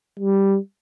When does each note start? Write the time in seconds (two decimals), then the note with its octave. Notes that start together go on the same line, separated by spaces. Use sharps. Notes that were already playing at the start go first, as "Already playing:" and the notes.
0.20 G3